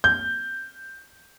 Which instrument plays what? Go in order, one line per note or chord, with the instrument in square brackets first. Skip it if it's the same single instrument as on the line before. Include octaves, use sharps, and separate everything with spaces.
[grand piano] G6